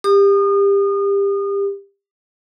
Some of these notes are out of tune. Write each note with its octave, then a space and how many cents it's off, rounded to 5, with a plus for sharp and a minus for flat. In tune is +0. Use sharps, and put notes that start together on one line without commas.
G4 +25 D#6 -35